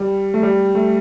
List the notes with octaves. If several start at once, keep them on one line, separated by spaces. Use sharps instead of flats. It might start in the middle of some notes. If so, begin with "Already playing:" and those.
Already playing: G3
A3
G3
A3